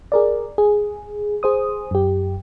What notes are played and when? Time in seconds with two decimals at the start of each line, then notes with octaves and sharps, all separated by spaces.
0.12 G#4 A#4 D5
0.58 G#4
1.43 G#4 C5 D#6
1.91 F#2 G4